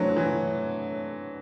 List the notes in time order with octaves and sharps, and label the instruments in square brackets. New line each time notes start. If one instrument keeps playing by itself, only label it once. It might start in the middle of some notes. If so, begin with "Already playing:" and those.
Already playing: [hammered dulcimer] D3 A3 C4 [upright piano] E3 F#3
[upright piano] E3